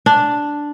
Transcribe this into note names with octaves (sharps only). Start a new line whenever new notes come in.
D4